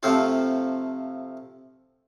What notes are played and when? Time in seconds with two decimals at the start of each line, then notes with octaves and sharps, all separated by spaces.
0.03 C3 F3 A3 C4 F4